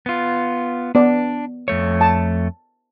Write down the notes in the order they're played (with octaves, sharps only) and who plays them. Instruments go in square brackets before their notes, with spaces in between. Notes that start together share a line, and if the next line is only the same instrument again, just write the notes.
[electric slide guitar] B3 F4
[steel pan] B3 D5 [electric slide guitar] D4
[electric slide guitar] F2 A3 C#5
[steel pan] A5